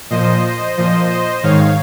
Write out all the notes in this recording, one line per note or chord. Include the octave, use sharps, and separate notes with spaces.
A#2 F3 C5 D#5
A#2 F3 C5 D#5
C5 D#5
G#2 D#3 C#5 F5